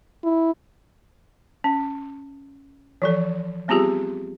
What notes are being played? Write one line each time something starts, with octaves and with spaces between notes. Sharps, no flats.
E4
C#4
E3 F3 A4
G3 B3 C4 F4 G4 G#4